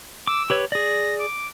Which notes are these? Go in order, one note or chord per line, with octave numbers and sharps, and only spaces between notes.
D6 E6
G4 B4 C#5
G#4 D5 A#6
D6